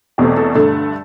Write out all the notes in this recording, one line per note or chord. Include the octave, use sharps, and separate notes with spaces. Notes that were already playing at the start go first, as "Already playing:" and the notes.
E2 B2 A3 C4 G4
A4
G2 D3 A3 A4